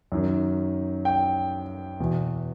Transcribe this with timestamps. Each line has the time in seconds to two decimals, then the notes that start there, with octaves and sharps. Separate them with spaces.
0.12 F#2 D#3
1.05 G5
2.00 E2 B2